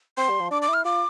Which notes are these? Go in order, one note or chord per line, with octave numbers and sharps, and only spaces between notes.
C4 C6
G3
F3
D4 D6
D6
E4 F6
F4 D6